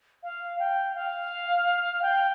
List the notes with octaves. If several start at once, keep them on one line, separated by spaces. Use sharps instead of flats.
F5
G5
F5
G5